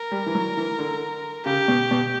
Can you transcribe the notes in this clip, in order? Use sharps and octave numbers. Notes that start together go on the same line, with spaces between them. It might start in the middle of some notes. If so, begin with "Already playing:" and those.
Already playing: A#4
G3
E3
F#3
E3
D3
C#3 G4
B2
B2